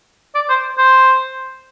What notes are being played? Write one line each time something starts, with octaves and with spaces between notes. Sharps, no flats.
D5
C5
C5